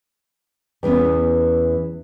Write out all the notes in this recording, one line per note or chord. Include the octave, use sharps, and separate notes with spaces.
E2 E3 B3 C#4